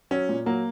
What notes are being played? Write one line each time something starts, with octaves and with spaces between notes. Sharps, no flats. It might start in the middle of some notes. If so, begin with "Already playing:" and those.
F#3 C#4
A#2
F#3 A#3